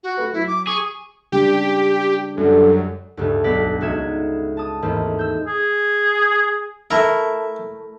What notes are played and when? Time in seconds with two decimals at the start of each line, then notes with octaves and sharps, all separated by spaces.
0.03 F#4
0.17 A3 A4 B4
0.33 F#3 E4
0.47 D6
0.67 G#4 C#6
1.32 C#3 G3 D4 G4
2.37 F#2 D3 G3
3.17 D2 G2 C#3 A3
3.44 B1 B3 B4 D5 B6
3.81 C#2 D#4 F#4 E5 G#6 E7
4.57 A5 D#6
4.82 D#2 G#2 E3 A3 C4
5.19 E6 G6
5.46 G#4
6.91 A3 E4 A#4 E5